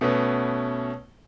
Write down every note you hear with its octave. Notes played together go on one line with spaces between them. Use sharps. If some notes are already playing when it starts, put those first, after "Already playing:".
B2 A3 B3 C#4